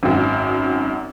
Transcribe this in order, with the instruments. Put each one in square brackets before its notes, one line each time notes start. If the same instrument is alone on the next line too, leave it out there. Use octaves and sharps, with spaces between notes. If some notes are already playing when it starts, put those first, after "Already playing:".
[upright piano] G#1 F#2